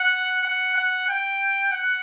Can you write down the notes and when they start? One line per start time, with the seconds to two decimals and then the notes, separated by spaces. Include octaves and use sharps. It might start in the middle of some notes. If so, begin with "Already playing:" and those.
Already playing: F#5
0.45 F#5
0.75 F#5
1.08 G5
1.72 F#5